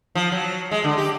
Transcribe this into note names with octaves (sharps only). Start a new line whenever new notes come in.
F3
F#3
G#3
D3
G4